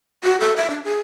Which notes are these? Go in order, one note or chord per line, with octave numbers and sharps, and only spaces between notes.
F#4
A4
E5
D4
G#4